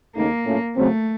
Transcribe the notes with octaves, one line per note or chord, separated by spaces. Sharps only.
D#2 C#3 A3 A#3 D#4
A2 A3 C#4 F4
C#3 F#3 A3 C4